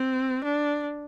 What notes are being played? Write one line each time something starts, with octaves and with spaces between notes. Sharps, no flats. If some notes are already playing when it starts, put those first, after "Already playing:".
Already playing: C4
D4